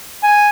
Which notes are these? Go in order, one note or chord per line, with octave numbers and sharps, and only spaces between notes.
G#5